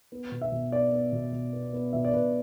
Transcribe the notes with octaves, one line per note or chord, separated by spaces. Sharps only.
B3
B2
E5
B2
B3 D5
B3
B2
B2
B3
B3
B2 E5
D5
B2 B4